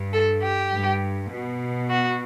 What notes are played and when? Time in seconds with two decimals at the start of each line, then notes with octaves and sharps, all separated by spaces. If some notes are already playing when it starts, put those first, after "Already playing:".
Already playing: G2
0.13 A4
0.42 G4
0.73 G2
1.31 B2
1.89 F#4